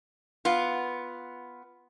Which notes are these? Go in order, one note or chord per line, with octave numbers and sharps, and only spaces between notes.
B3 F4